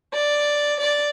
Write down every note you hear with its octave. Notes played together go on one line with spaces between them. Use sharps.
D5
D5